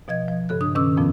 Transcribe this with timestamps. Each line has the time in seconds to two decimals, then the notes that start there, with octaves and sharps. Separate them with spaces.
0.08 B2 F3 D#5 G#6
0.28 F3
0.49 G2 C#3 A4 F#6
0.61 D4 D#6
0.75 B2 D#3 C#4 D6 E6
0.97 F2 A#2 F3 B3